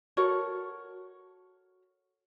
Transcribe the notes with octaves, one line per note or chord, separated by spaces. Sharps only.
F#4 A4 A#4 C#5